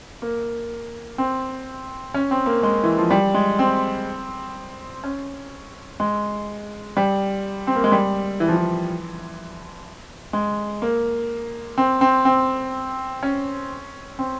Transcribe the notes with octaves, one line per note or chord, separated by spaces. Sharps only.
A#3
C4
C#4
C4
A#3
G#3
E3
F3
G3
G#3
C4
C#4
G#3
G3
C4
A#3
G#3
G3
E3
F3
E3
G#3
A#3
C4
C4
C4
C#4
C4